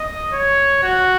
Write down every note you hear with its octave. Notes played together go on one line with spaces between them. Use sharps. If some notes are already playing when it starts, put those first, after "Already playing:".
Already playing: D#5
C#5
F#4